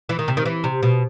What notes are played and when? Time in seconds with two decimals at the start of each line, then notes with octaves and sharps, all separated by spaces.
0.09 E3
0.19 D#3
0.28 C3
0.37 D#3
0.45 E3
0.64 C3
0.83 B2